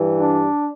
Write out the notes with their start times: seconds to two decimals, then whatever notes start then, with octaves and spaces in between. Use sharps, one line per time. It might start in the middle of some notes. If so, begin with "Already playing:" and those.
Already playing: G2 E3
0.19 D4